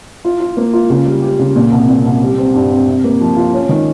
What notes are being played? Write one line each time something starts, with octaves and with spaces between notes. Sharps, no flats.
F4
F4
A#3
F4
C#3
G3
G4
C#3
A#2
C2
A#2
C2
G3
C4
G2
C4
C3
A#3
F3
F4
C#4
D#3